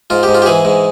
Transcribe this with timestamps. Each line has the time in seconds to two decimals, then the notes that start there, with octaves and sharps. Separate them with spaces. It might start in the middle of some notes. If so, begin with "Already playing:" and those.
0.10 G#2 F4
0.23 G#2 G4
0.34 F4
0.42 G4
0.46 E3 G#4
0.65 G#2